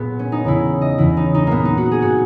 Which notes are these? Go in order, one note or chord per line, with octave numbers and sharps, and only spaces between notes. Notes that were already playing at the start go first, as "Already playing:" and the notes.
Already playing: A#2 B3 G#4
C#4
D#4
E2 C#3 E3 E4
D#5
E2 C#3 E3 E4
D#4
D#4
A#2 A#3 B3
D#4
F#4
G#4
A#2 F#4